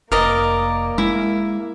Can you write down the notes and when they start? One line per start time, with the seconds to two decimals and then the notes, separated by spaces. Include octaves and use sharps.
0.12 F1 A#3 A#4 D5 D#5
0.98 G#3 E4